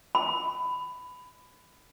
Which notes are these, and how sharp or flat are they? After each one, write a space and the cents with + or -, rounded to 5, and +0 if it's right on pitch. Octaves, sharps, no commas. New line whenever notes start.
B5 +15